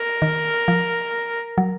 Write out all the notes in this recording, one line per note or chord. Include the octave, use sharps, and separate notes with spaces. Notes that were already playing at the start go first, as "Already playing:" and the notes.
Already playing: A#4
D#3
F3
F#3